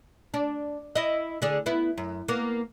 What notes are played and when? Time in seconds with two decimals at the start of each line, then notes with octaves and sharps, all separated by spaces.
0.34 D4
0.95 E4 D#5
1.42 D3 D4 G#4
1.66 B3 E4
1.98 F#2
2.28 A#3 B3